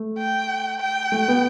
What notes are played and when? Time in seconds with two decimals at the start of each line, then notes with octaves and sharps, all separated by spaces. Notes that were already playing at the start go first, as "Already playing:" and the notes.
Already playing: A3
0.18 G5
0.80 G5
1.12 A3
1.28 B3